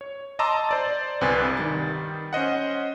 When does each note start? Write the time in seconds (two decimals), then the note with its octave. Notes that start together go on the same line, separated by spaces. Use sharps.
0.01 C#5
0.39 D#5 A5 A#5 C6 D6 E6
0.69 C5 D5 A6
1.21 G1 C2 C4 B4 G#5 A6
1.57 D#3 G3 A6
2.33 C#4 C5 D#5 F#5